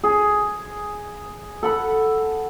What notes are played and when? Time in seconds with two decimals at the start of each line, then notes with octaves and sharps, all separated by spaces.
0.04 G#4
1.63 A4 F#5 B5